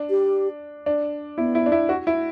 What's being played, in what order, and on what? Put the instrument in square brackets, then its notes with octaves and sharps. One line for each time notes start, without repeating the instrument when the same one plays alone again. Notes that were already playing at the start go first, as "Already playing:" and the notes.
Already playing: [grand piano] D4
[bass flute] G4
[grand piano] D4
[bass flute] B3 [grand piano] E4
[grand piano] E4
D4
E4
F#4
E4